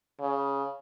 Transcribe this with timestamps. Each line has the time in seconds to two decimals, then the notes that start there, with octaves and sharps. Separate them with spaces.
0.20 C#3